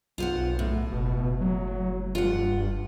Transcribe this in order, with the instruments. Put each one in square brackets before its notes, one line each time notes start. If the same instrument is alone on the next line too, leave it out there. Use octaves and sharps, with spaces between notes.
[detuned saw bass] B1 [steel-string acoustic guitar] F4 C5 F#5
[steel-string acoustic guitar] A2
[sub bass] F#1 [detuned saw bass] B2
[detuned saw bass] F#3
[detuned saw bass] G2 [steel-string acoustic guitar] F4 F#5